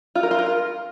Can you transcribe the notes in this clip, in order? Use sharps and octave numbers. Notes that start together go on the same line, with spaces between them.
F4
A#4
F4
A#4
F4